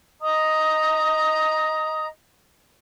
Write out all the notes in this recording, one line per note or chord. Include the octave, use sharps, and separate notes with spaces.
D#5 A#5 D#6